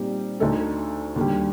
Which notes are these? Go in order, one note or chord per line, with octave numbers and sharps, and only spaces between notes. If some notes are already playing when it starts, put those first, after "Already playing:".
Already playing: A#2 G3 C4 D#4 G4
D2 D3 A3 D#4 A4
D#2 D3 G3